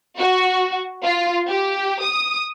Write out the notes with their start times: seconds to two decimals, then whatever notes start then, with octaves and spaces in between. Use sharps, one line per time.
0.17 F#4
1.03 F4
1.49 G4
2.03 D#6